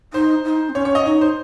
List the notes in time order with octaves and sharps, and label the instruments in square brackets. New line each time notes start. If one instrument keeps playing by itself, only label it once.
[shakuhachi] D#4 [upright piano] C5
[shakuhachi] D#4
C4
[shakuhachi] C#4 [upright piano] C#5
[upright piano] C#5
D#5
[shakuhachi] D#4 [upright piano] C#5
[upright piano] C5